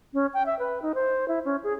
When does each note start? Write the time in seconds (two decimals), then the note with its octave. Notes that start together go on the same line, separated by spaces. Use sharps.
0.13 C#4
0.34 G5
0.46 E5
0.59 B4
0.82 D#4
0.95 C5
1.28 E4
1.45 C#4
1.64 G#4